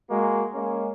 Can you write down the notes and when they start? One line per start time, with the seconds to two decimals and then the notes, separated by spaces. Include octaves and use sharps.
0.10 G#3 A#3 F#4
0.54 G#3 A#3 C#4